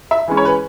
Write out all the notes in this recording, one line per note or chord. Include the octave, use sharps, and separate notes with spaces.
E5
E3 G#3 C#4
C#5
B4